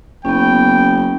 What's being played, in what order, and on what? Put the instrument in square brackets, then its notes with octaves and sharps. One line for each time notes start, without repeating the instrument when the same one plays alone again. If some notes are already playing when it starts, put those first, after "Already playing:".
[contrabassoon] F#1 [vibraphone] B3 C#4 [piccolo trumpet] G5